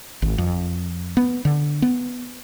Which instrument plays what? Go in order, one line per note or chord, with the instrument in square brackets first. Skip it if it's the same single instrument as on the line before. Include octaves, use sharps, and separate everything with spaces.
[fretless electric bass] G#1
F2
B3
D3
B3